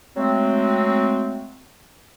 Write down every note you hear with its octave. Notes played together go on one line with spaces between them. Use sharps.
F#3 G#3 A3 C4